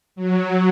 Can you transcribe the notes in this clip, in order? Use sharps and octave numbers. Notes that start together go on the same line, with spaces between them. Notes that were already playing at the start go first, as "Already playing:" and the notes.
F#3